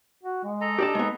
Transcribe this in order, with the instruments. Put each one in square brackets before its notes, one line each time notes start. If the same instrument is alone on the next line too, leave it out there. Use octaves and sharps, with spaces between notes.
[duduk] F#4
G#3
[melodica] A4 D#5 A#5
[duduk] D4 [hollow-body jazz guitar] G4 D5 A5
[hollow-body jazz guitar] G#3 B3 [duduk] D#4